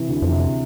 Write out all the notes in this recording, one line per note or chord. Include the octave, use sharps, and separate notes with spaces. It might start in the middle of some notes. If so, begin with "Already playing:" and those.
Already playing: C3 E3
D2
F2
C3